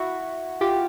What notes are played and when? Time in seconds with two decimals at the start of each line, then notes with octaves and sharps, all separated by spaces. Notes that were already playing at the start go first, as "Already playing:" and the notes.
Already playing: E4 F#4
0.61 F4 G4